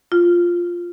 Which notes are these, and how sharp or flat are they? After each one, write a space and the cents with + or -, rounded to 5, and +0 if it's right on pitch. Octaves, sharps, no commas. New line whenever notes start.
F4 +0